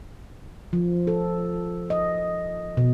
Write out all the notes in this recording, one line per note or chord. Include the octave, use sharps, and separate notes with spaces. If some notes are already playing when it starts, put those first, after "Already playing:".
F3
A4
D#5
B2